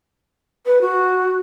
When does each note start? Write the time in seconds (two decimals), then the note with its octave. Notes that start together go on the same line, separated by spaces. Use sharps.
0.66 B4
0.81 F#4